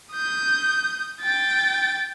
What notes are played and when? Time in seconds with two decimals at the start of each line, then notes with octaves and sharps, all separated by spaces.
0.12 D#6 G6
1.22 G5 A6